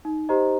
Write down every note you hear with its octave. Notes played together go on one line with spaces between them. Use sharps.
D#4
G4 C5 D#5 A#5